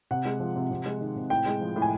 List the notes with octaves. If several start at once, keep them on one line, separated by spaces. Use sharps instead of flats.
C3 F#5
G#3
F3
C3
C3
G#3
D#3
C3
A2 G5
G#3
F3
A2
G#5